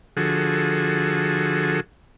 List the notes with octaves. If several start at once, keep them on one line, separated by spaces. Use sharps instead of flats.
D3 F3 F#4 G#4 A4